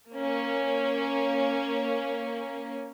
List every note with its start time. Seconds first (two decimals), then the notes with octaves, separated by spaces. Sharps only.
0.11 A#3 C#4